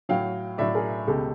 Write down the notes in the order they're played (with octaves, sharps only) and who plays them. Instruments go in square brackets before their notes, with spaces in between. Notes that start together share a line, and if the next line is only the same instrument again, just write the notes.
[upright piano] A2 F#3 F5 G5
A2 F#3 D5 E5
G#4 A#4
C#2 B2 G#3 G4 A4